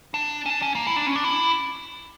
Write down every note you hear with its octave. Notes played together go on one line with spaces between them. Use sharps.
D4
C#4
D4
C#4
A#3
E4
D4
C#4
D4
E4